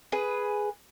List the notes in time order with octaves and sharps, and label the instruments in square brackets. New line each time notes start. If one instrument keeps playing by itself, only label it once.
[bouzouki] G#4 B4